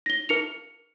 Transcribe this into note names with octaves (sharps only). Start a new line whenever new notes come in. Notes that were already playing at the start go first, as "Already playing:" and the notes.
A#6 G7
A#4 C#7 F7